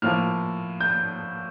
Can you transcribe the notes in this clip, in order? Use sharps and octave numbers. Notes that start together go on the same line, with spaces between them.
A2 F3 A#3 F6
G6